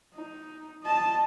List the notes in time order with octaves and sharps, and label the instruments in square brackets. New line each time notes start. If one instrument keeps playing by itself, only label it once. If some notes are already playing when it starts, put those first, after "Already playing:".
[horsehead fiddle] D#4
D#5 A5